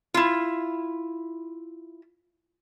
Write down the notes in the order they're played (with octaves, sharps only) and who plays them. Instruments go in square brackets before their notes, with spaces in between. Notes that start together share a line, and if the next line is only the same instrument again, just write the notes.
[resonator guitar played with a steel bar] E4 F4